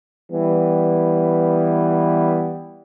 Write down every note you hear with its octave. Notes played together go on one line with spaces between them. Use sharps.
E3 G3 B3